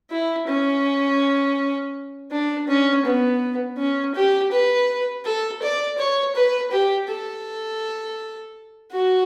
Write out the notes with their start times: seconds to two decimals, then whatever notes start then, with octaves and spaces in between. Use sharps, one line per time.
0.10 E4
0.47 C#4
2.31 D4
2.67 C#4
3.05 B3
3.78 C#4
4.15 G4
4.51 B4
5.25 A4
5.62 D5
5.98 C#5
6.35 B4
6.71 G4
7.08 A4
8.92 F#4